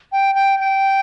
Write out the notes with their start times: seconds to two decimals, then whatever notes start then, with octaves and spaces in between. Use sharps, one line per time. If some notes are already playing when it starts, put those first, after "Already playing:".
0.12 G5
0.35 G5
0.59 G5